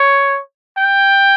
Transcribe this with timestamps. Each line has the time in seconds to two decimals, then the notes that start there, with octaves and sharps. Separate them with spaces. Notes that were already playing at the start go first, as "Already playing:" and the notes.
Already playing: C#5
0.78 G5